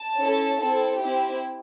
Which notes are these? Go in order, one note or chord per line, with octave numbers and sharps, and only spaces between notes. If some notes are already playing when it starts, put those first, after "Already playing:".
Already playing: A5
C#4 E4 A4
C4 E4 A4
C4 E4 G4